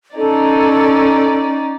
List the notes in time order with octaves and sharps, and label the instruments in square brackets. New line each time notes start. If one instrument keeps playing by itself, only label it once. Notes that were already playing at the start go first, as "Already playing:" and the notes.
[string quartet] C#4 D#4 D5 [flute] A4